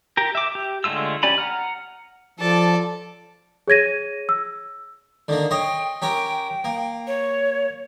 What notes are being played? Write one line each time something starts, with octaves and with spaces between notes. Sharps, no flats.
G4 A#4
E5 D6
G4
D3 G#3 A3 F4 E6
C#4 G4 D5 G#5 B5
F#5 A#5 F6
F3 A4 D5 A5
G#4 C#5 G#6 A#6 D#7
E6
D3 D#3 A#3
C#5 D#5 G5 C6
C#4 G4 A#4 G5
A#3
C#5